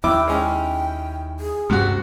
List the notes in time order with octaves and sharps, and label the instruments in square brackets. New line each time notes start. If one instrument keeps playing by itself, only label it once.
[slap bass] D#2 [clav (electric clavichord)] E4 [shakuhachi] G5 [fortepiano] D6
[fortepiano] G#3 C#4 [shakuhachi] G5
[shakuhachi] G#4
[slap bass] D2 G2 A3 [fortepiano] C3 F#4